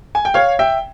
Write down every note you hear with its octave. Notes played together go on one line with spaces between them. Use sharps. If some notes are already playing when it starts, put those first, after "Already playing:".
G#5
G5
C#5 F5
E5 G5